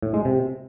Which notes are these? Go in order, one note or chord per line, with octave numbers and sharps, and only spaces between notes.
A2
G#3
C3